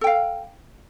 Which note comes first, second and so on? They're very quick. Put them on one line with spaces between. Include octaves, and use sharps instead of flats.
A4 G5 F5